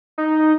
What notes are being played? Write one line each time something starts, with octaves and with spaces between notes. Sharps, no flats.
D#4